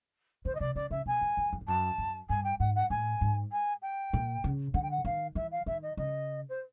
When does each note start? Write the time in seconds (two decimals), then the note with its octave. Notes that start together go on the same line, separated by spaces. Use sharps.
0.45 D3 C5
0.55 D#5
0.60 C3 D5
0.75 C#3 D5
0.91 C#3 E5
1.06 B2 G#5
1.21 F#2
1.37 F2
1.53 F2
1.61 G2
1.68 F#2 A5
1.98 F#2
2.29 G2 G#5
2.44 G5
2.60 G#2 F#5
2.75 F#5
2.90 A2 G#5
3.21 G#2
3.52 G#5
3.82 G5
4.13 A#2
4.44 C#3
4.74 D3 F#5
4.82 G5
4.91 F#5
5.05 D#3 F5
5.35 E3 E5
5.51 F5
5.66 D#3 E5
5.82 D#5
5.97 C#3 D#5
6.49 C5